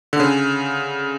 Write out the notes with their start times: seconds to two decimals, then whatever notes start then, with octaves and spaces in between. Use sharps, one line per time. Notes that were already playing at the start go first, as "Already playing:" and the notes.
0.13 D3
0.20 C#3